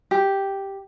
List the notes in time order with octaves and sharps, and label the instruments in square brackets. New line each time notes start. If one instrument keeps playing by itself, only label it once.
[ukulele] G4